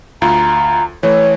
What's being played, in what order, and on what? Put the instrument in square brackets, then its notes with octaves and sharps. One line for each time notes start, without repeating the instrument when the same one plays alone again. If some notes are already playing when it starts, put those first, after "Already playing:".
[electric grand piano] D2 F4 [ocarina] A#5
[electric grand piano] E3 A3 [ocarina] C#5